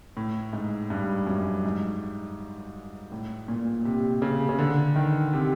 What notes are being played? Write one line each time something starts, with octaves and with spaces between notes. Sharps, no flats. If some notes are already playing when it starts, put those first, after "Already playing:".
A2
G#2
G2
F#2
G#2
A2
A#2
C3
C#3
C#3
D3
D#3
C3